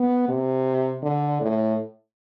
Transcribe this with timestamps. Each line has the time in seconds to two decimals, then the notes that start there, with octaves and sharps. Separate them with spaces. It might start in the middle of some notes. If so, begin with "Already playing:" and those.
Already playing: B3
0.29 C3
1.03 D3
1.41 A2